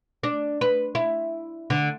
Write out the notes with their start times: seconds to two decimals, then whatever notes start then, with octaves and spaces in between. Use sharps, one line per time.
0.23 D4
0.61 B4
0.95 E4
1.70 D3